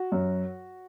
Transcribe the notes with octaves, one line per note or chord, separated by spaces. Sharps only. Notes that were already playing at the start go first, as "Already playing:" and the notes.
Already playing: F#4
F#2